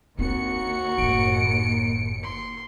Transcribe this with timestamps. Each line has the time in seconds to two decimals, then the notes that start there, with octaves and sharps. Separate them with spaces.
0.19 D#2 C4 D4 F#4 C#7
0.98 F#1 A2 D7
2.24 C6